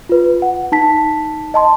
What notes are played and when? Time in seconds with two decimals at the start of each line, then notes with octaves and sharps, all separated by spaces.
0.09 F4 B4
0.42 F#5
0.72 D#4 A5 B6
1.54 D#5 A5 C6